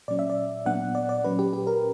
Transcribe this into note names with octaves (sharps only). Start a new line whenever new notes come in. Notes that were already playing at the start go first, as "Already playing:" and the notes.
A#2 F#3 C#4 D5
E5
D5
A#2 F#3 B3 D4 F#5
D5
D5
A#2 F#3 C#4 B4
G4
G4
A#4